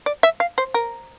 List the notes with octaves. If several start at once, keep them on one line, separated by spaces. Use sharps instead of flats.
D5
E5
F5
C5
A#4